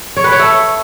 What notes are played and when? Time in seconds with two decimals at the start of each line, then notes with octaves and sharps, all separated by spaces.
0.17 C#5
0.24 B4
0.32 C#5
0.39 A3